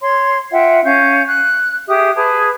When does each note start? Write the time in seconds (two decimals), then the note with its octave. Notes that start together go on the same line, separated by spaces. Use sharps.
0.01 C#5 C6
0.51 F4 E5 F#5 G5
0.84 C#4 F5 G6
1.27 F#6
1.88 G4 G#4 E5 D#6
2.16 G#4 B4 A5